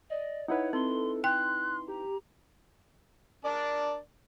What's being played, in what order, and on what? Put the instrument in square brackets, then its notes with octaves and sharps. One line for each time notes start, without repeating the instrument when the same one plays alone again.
[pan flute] D5 [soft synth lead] D#5
[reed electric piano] D#4 E4 B4 [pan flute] C#5 [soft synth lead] F#5
[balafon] C4 [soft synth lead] A4 [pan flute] C6
[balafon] G5 [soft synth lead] C6 [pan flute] F#6
[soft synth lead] G4 [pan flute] A#5
[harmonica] D4 A#4 D5